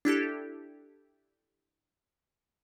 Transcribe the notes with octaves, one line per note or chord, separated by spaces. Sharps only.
D4 E4 G4 A4